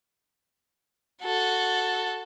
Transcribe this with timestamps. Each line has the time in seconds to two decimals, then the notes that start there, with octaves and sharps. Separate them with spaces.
1.22 F#4 A4